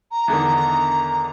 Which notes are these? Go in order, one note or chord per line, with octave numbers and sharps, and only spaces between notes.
A#5
E2 D3 D#3